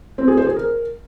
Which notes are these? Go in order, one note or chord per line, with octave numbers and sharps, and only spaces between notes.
C4
G#4
C5
G#4
A#4